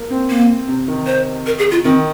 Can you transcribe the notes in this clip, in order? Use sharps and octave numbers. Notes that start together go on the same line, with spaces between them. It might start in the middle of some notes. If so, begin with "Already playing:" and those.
Already playing: A#3
C4
A#3
C3
D#3
C5
A#4
G#4
F4
D#3 C4